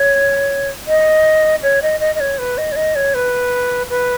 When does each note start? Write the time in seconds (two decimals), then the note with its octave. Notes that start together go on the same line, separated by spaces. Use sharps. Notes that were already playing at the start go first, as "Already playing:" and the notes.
Already playing: C#5
0.87 D#5
1.62 C#5
1.82 D#5
2.00 D#5
2.15 D#5
2.20 C#5
2.38 B4
2.58 D#5
2.72 C#5
2.76 D#5
2.95 C#5
3.14 B4
3.90 B4